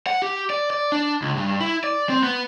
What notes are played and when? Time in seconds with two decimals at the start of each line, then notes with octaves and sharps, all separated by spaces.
0.07 F#5
0.22 G4
0.50 D5
0.70 D5
0.92 D4
1.22 C#2
1.37 G2
1.60 E4
1.84 D5
2.09 C4
2.23 B3